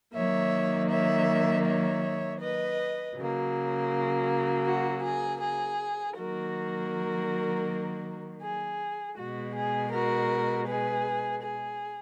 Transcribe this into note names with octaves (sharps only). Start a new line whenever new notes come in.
D#3 F#3 A#3 C#5 E5
C#5 E5
C#5 E5
B4 D#5
C#3 F#3 A#3
F#4
G#4
G#4
D#3 F#3 A#3 F#4 A#4
G#4
B2 G#3 F#4
G#4
F#4 A#4
G#4 B4
G#4